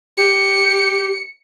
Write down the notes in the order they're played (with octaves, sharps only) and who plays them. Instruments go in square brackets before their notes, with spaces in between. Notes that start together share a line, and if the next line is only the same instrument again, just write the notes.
[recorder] G4 [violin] C#7